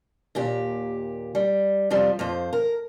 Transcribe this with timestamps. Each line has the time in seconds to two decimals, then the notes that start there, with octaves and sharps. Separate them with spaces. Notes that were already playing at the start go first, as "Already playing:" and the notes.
0.35 D#2 A#2 G4
1.35 G3
1.90 F2 C3 F3 G3
2.19 F2 F3 C5
2.53 A#4